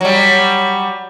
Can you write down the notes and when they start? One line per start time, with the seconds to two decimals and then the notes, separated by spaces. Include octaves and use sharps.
0.01 F#3 G3